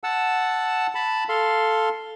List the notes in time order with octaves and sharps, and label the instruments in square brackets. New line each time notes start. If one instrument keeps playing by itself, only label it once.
[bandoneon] F#5 A5 E6
A5 B5
A4 F5 C6